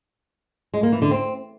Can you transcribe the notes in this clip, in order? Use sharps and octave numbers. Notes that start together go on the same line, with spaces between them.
G#3
A#3
E3
D3
C4